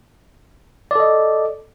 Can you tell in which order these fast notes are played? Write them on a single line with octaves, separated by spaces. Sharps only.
D5 A4 D#5